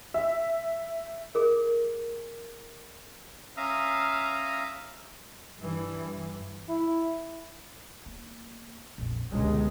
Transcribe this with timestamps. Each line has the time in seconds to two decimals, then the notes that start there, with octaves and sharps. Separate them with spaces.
0.14 E5
1.35 G#4 A#4
3.57 C#4 E5 F5 A#5 D#6
5.59 G2 E3
6.69 E4
8.06 A#3
8.98 A#1 F2
9.32 G1 C#2 B2 G#3 D#4